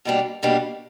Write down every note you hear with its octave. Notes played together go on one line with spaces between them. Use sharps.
B2 G3 A#3 D4 G4
B2 G3 A#3 D4 G4